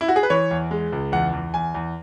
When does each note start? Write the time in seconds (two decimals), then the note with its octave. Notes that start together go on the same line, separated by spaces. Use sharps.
0.01 E4
0.08 F#4
0.16 G#4
0.23 B4
0.30 E3 C#5
0.51 E2
0.71 G#3
0.92 C#2
1.12 E2 F#5
1.33 E2
1.54 E2 G#5
1.75 E2